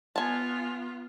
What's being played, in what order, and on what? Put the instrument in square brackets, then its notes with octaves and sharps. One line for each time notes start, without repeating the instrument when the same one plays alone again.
[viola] B3 F4 [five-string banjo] G#5 A5